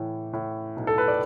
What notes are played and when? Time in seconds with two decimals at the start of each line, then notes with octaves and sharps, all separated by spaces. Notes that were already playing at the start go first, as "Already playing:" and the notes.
Already playing: A2 E3
0.33 A2
0.76 B1
0.87 A4
0.98 B4
1.08 D5